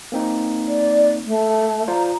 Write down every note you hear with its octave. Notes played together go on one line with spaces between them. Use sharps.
A#3 C4 D#4
D5
A3
F4 C5 D5 A#5